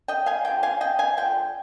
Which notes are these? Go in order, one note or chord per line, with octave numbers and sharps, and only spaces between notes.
D#5 G5
F5 G#5
D3 F3 C4 G5
F5 G#5
D#5 G5
F5 G#5
D3 F3 G5